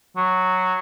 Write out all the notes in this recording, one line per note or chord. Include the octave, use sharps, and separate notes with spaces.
F#3